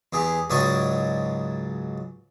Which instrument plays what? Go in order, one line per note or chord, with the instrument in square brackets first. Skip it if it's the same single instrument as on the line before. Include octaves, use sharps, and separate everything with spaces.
[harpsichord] E2 G4 G#4
C#2 G#2 F#3 D5 C#6 D#6